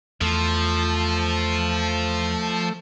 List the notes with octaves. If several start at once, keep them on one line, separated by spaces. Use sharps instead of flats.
E2 F3 A3